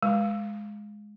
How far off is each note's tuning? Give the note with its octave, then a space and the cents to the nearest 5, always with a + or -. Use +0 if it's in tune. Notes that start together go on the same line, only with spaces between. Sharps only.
G#3 +5